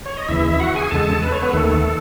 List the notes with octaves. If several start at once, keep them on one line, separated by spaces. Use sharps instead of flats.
C#5
D#5
D#2 C#3 E3 E4 E5
E5
F#4 F#5
G#4 G#5
E2 C#3 G#3 A4 A5
B4
C#5
B3 B4
D#2 D#3 A3 A4